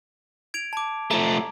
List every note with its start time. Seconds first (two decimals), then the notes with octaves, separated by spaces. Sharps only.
0.54 G#6 D7 F7
0.73 A5 D6
1.11 F3 A3 A#5